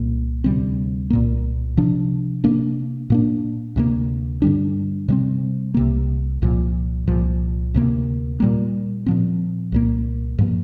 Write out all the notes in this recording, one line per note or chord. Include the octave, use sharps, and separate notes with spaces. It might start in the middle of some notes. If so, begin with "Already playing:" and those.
Already playing: C2 A#2 A#3
D2 C3 G3 C4
C2 A#2 A#3
C3 F3 D4
C3 A#3 D4
A#2 A#3 D4
D2 C3 G3 A#3
G2 D3 G3 D4
C3 G3 C4
C2 C3 A#3
C2 A#2 F3
C2 A#2 F3
D2 C3 A#3
A#2 G3 A#3
A#2 F3 C4
C2 A#2 A#3
G2 F3 A#3